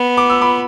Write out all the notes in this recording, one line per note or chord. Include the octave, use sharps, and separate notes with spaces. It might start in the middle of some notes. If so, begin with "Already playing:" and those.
Already playing: B3
D6
E6
B5 D6